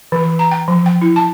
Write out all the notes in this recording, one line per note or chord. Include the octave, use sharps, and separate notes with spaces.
E3
A#5
G5
F3
G5
E4
A5